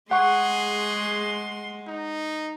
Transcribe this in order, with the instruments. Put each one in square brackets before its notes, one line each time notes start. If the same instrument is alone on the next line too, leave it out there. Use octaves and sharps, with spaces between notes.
[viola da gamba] G#3 [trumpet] G#4 [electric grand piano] F#5 C#6 [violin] C6
[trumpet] D#4